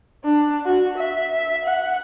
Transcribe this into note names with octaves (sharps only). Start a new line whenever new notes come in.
D4
F#4
E5
E5
F#5